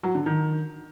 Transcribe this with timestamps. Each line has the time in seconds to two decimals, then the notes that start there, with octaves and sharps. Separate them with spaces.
0.03 F#3
0.15 D3
0.26 D#3